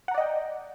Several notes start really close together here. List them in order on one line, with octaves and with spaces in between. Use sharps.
F#5 A#5 D5 D#5 G5